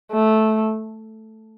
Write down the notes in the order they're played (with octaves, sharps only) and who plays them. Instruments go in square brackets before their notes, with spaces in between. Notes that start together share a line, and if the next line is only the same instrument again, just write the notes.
[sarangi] A3